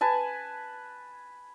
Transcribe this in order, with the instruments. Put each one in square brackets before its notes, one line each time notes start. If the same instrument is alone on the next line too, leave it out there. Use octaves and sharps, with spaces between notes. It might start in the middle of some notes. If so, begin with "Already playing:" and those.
[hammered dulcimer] B4 G#5 A5